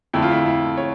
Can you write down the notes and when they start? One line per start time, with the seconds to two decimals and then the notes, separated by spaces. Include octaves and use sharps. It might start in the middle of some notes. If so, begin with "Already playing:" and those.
0.13 F2 D3 A3 E4
0.23 F4
0.31 E4
0.46 E4
0.77 C#5